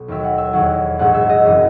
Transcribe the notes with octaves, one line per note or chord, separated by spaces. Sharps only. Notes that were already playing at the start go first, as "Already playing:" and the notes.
Already playing: B1
D#2 D#3 F#3 E5
F#5
E5
E2 D#3 F#3 F#5
A#1 G#2 F#3 F#5
E5
D#5
F#1 E3